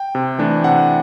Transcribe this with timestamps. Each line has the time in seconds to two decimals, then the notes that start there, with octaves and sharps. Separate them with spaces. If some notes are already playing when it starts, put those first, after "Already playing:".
Already playing: G5
0.15 C3
0.38 E3 A3 D4
0.64 C3 F#5